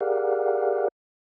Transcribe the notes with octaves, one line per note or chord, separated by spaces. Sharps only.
G4 G#4 A#4 D5 F5 F#5